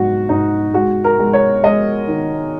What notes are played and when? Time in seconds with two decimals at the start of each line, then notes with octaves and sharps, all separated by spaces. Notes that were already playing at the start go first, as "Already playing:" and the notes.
Already playing: G#2 F#3 F#4
0.29 G#2 D#4
0.74 G#3 F#4
1.04 A#4
1.19 G#3
1.33 C#5
1.63 G#3 D#5
2.08 D#3